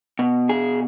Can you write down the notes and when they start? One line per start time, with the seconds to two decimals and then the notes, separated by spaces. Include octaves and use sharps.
0.19 B2
0.49 G#4